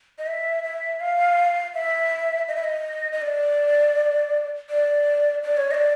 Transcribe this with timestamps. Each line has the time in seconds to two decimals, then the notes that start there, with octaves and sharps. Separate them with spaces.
0.19 D#5
0.27 E5
0.64 E5
1.00 F5
1.74 E5
2.48 D#5
2.56 E5
2.64 D#5
3.12 D#5
3.22 D5
4.69 D5
5.43 D5
5.57 C#5
5.71 D#5
5.74 D5